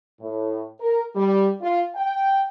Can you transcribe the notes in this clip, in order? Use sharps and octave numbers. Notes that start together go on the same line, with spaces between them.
A2
A#4
G3
F4
G5